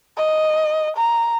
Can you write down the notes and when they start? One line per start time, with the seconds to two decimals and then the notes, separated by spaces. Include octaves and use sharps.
0.17 D#5
0.96 A#5